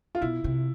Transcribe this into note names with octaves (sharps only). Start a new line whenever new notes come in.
F4
B2 E4
C3